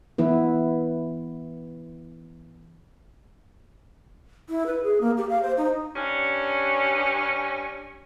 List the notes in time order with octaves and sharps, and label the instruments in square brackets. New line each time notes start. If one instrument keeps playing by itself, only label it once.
[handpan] E3 B3 E4 B4
[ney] E4
B4
G#4
A#3
G4
F5
C5
D#4
[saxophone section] G2 C#4